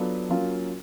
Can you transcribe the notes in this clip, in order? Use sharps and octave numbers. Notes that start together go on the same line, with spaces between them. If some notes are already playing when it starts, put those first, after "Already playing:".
Already playing: F#3 B3 D4 F4 A4
F#3 A#3 C#4 F4